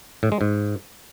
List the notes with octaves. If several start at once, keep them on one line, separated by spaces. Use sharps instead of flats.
A2
G#3
G#2